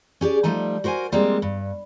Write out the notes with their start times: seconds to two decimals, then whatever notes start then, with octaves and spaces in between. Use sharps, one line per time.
0.21 C#4 G4 G#4 D5
0.44 F3 G3 A3 D#4
0.84 F#4 A#4 C5 F5 G#5
1.12 F3 G3 G#3 A#3 C4
1.42 G2